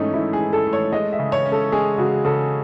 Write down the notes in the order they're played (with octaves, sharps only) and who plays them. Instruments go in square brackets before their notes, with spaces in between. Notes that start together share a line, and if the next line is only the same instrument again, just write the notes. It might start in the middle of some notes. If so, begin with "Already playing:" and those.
Already playing: [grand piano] G#2 E3 A3 [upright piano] C#4 D#4
[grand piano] G#2 [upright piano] E4
[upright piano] G#4
[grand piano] E4
[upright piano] A4
[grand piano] A3
[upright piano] C#5
[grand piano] G#3 [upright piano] D#5
[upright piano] E5
[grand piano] C#3
[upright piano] C#5
[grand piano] C#4
[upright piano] A4
[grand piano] G#3 [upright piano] G#4
[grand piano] C#3 [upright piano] F#4
[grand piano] C#3 [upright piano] A4